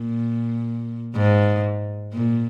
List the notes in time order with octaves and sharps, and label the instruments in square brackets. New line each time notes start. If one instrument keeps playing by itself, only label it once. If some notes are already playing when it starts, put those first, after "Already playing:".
Already playing: [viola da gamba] A#2
G#2
A#2